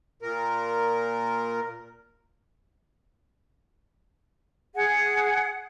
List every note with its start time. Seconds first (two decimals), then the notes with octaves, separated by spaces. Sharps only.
0.22 A#2 A#4
4.75 G#4 F#5